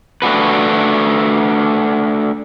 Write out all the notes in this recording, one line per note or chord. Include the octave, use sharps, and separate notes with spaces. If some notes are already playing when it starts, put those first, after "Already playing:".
A3 D4 F#4 B4